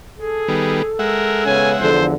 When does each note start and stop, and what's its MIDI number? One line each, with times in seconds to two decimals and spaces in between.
0.18 0.94 68
0.18 1.70 69
0.48 0.82 51
0.48 0.82 55
0.48 0.82 59
0.99 1.90 56
0.99 1.44 70
0.99 1.90 76
0.99 1.90 78
1.46 1.74 49
1.46 1.74 59
1.46 1.74 61
1.46 1.72 80
1.79 2.13 40
1.79 2.13 50
1.79 2.13 53
1.79 2.09 69
1.79 2.05 72